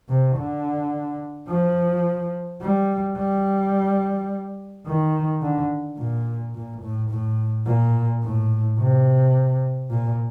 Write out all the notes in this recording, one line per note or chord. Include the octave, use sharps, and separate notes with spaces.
C3
D3
F3
G3
G3
D#3
D3
A#2
A#2
A2
A2
A#2
A2
C3
A#2